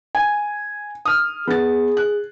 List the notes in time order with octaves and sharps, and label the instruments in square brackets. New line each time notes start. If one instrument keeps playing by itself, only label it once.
[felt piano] G#5
D#6 F6
[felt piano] B3 A6 [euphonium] G#4
[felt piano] F#6